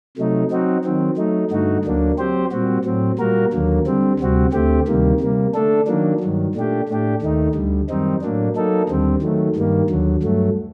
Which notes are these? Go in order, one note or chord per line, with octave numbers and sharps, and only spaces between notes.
C3 F#3 A3 D#4
F#3 C4 D#4 F#4
D#3 F#3 C4
F#3 A3 D#4
G2 D3 A3 D#4 F#4
D2 D3 F#3 A#3 D4
F#3 C4 G4 C5
A#2 G3 C4 F#4
A2 F#3 C4
A#2 G3 A#3 F#4 A#4
D#2 D3 F#3 A#3
D3 G3 C4
D2 C3 G3 C4 F#4
D2 D3 A3 C4 G4
D2 C3 D#3 G3 A#3
C3 G3 A#3
D3 A3 D4 A4
D#3 F#3 A#3 D4
G2 D#3 F#3
A#2 A3 D4 G4
A2 A3 D4 G4
D#2 D#3 A3 D#4
D2 D3 G3
F#2 D#3 G3 C4 D#4
A2 F#3 A#3 D4
F#3 A#3 D#4 A4
D#2 D3 G3 C4
D#3 F#3 A3
G2 D#3 G3 A#3
D#2 D3 F#3
G2 F#3 A3